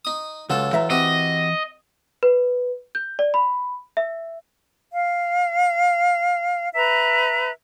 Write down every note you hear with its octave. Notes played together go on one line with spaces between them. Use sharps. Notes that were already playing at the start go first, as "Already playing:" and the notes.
D#4 D#6
C#2 F#3 F4 A4
E3 E5 A#5
C4 F#4 G4 D#5
B4
G6
D5
B5
E5
F5
B4 E5 A#5